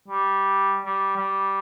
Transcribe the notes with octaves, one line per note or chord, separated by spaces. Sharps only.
G3
G3
G3